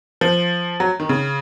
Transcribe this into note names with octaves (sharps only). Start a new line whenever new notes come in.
F3
F#3
D#3
C#3